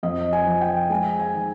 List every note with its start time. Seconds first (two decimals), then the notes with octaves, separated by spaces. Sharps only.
0.03 F2 D#5
0.33 G#5
0.47 F3
0.61 G5
0.90 G#3 G#5
1.19 G#5
1.34 D#3